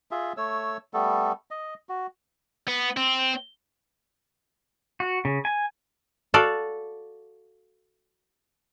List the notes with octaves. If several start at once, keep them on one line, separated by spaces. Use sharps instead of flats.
F4 G#4 E5
A3 C#5 E6
G3 A3 B3 A4
D#5
F#4
B3
C4
F#4
C#3
G#5
F#4 A4 D5 F5